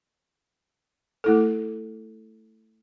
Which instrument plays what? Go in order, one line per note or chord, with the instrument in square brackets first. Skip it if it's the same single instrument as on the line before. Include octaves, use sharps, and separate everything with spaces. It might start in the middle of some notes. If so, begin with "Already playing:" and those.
[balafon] A3 E4 A4